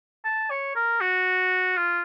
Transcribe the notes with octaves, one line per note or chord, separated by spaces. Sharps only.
A5
C#5
A#4
F#4
F4